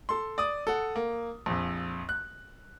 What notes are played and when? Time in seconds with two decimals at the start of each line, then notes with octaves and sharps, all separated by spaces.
0.09 A4 C6
0.38 D5 D#6
0.67 A4 F#5
0.96 A#3
1.46 A#1 F2
2.09 F#6